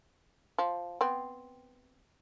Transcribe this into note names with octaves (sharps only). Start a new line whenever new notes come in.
F3
B3 C4